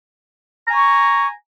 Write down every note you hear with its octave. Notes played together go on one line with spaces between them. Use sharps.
G#5 A#5 C#6